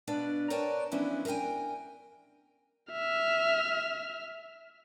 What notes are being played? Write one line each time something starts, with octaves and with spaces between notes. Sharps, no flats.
B2 D4 B4 F5
A#4 B4 C#5 D5 G5 A5
E3 F3 B3 C#4 D4 E4
A#4 E5 F5 G5 G#5
E5 F6